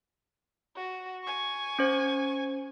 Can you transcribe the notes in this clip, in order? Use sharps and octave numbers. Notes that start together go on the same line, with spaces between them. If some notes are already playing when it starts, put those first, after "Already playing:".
F#4
G#5 C#6
C#4 C5